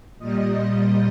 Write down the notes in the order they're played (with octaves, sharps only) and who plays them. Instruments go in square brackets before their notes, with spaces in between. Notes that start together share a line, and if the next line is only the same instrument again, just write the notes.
[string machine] A#2 G3 D#5